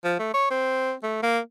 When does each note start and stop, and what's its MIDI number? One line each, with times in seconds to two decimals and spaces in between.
0.04 0.16 53
0.19 0.31 57
0.34 0.49 73
0.51 0.93 60
1.03 1.21 57
1.23 1.39 58